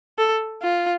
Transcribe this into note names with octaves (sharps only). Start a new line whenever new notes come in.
A4
F4